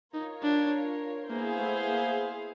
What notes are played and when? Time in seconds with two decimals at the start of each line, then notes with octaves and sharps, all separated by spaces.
0.14 D#4 F4 A#4 C#5
0.42 D4
1.29 A#3 B3 E4 G#4 C5 F5
1.58 A3
1.88 A#3